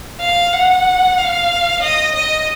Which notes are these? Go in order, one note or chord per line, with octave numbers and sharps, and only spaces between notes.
F5
F#5
F5
D#5
D#5